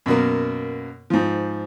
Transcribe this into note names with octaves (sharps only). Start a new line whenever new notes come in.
F#2 B2 A#3
G#2 F3